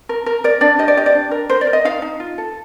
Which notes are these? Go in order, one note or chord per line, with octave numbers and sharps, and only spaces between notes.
A#4
A#4
A#4 D5
D4 D5
G4 D#5
D5
G4 D#5
D5
D4
A#4
A#4 C5
D5
A#4
D#5
D#4 F5
D#4
F4
A4